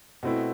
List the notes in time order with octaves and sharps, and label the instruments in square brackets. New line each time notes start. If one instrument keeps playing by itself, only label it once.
[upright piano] B2 A3 C4 E4